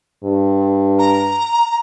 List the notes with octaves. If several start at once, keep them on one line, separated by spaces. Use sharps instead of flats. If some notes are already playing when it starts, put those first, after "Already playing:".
G2
A#5